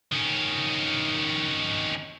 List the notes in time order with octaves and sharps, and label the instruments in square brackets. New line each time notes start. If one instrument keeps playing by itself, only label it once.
[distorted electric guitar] D#3 C#4